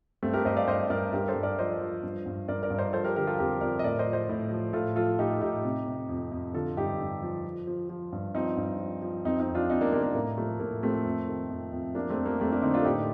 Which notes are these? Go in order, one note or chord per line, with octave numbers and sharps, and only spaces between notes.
G2 A3 C4
G4 A#4
G2 C5 D#5
D5 F5
G2 C5 D#5
G2 A#4 D5
G2 G4 A#4
A4 C5
G2
A#4 D5
F3 C5 D#5
F3
G2
G2
G2 A#4 D5
A#4 D5
G2
C5 D#5
F3 A4 C5
G4 A#4
D3 G4 A#4
F4 A4
F2 G4 A#4
F2 A#4 D5
D#5
A2 A#4 D5
C5 D#5
F3
C5 D#5
A2
F3
A2 F4 A4
F3 F4 A4
A2 D#4 G4
A2 D#4 G4
C3
C3
F2
F2
D3 F4 A4
G2 D#4 G4
G2
F3
F3
F3
F3
G2
F3 C4 D#4
G2
F3
F3
F2 C4 D#4
C4 D#4
F2
D4 F4
F2 C4 D#4
A#3 D4
C3 A#3
A#3
A2 A#3
F3 A3
A2 A#3
F3 A3 C4
F2
D#3
F2
F2
F3 A#3 D4
A3 C4
F2
A#3
F2 A3 C4
A#3 D4
D3 C4 D#4
D4 F4
A4
A2 D#4 G4